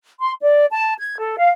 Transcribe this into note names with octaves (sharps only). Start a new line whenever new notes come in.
C6
D5
A5
G#6
A4
F5